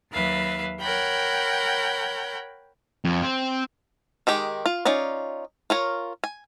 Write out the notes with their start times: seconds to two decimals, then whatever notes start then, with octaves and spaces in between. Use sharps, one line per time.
0.11 D#2 F#3 B4 E5 F5
0.80 A#4 C#5 F#5 G5 B5 G6
3.05 F2
3.22 C4
4.27 D#3 G#3 G4
4.66 F4
4.85 C#4 D#4 F4 D5
5.70 F4 A#4 C#5
6.24 G#5